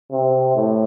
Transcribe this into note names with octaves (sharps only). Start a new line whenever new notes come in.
C3
A2